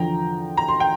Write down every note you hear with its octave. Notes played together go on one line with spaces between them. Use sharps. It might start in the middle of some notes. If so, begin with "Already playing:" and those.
Already playing: E2 D3 F3 G5 A#5
A#5
C6
G5